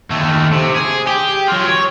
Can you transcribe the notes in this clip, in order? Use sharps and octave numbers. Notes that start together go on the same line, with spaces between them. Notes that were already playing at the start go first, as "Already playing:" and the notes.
D#2 A3
C3
G#4
G4
F#3 F4
C#5